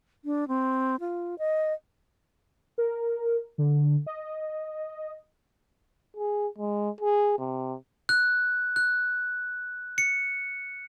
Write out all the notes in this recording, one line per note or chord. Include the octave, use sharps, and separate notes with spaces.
D4
C4
F4
D#5
A#4
D3
D#5
G#4
G#3
G#4
C3
F#6
F#6
C#7